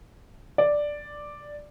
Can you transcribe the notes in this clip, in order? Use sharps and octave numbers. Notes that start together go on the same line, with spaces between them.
D5